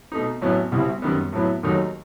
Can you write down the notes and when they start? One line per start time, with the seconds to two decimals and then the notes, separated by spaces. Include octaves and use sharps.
0.12 B2 A3 D#4
0.42 A1 A2 F#3 B3 E4
0.72 C2 B2 G3 C4 E4
1.02 F#2 D#3 G3 B3
1.33 A2 F#3 B3 E4
1.63 D#2 D#3 F#3 A3 D#4